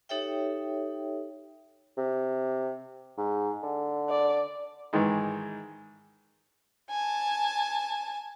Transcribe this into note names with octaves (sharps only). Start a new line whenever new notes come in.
D#4 G4 A4 C#5 E5 G5
C3
G#2
D3
D5
G#2 D#3 E3 G#3 D#4
G#5 A5